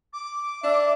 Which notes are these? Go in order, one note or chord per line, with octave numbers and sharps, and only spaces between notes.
D6
D4 E5